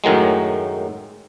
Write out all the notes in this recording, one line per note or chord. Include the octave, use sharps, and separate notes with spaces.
F#2 A2 D#3 F#3 G#3